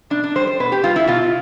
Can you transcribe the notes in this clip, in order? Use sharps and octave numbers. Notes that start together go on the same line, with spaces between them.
B2 D4
D4
G3 C5
C5
B2 B4
G4
G3 F4
E4
B2 F4